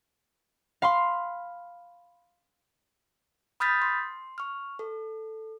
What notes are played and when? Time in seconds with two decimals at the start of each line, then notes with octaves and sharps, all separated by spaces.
0.82 F5 B5 C6
3.60 B5 D#6 F6 G6 A6 B6
3.82 C6
4.38 C#6 F6
4.79 A4